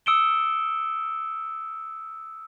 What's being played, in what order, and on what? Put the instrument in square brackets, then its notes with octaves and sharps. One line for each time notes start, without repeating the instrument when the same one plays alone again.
[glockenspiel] D#6 E6 C#7 D7 E7 G7